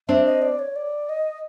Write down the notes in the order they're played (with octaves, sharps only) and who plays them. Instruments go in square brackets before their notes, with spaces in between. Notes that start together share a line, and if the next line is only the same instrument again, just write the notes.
[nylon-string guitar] C4 D4 [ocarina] E5
[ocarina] D#5
D5
C#5
D5
D#5